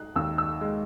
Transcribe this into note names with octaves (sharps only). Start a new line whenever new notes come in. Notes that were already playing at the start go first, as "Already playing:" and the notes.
Already playing: D#4 F#6
D#2 E6
E6
G#3